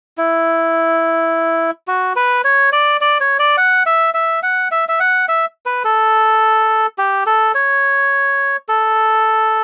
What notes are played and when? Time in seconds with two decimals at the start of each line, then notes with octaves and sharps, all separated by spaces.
0.18 E4
1.87 F#4
2.16 B4
2.44 C#5
2.73 D5
3.01 D5
3.20 C#5
3.39 D5
3.58 F#5
3.86 E5
4.14 E5
4.43 F#5
4.71 E5
4.89 E5
5.00 F#5
5.28 E5
5.66 B4
5.84 A4
6.98 G4
7.26 A4
7.55 C#5
8.69 A4